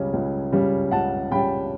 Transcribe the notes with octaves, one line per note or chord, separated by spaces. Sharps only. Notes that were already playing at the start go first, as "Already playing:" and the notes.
Already playing: C#2 C#3 G3 C#4
C#2
C#3 G3 C#4
C#2 F#5 A5
C#3 G3 C#4 G5 B5